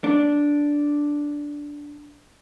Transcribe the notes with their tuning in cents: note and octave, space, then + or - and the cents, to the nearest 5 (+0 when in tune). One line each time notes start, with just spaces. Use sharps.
D4 -5